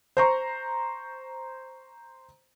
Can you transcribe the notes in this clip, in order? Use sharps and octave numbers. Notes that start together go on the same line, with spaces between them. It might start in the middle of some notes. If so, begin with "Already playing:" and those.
C5 A#5 C#6